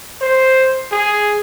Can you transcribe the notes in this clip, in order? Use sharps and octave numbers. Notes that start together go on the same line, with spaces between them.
C5
G#4